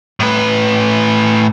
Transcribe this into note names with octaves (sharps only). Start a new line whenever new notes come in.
A2 B4